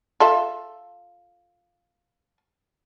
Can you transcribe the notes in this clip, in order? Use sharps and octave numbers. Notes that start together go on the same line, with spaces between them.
F4 A4 E5